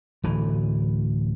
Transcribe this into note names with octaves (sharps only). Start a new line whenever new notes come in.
D1 E3